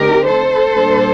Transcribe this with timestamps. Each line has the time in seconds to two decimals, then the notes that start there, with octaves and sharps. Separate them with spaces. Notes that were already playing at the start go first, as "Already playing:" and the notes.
Already playing: D3 A3 C4 D#4 G4 A#4
0.26 A4 C5
0.71 A#2 G3 A#3 D4